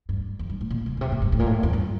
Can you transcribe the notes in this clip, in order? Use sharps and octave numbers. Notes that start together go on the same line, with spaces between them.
G2
F2
G2
A2
A#2
C3
A#2
C3
A#2
G2
A2
A#2
A2
F2
G2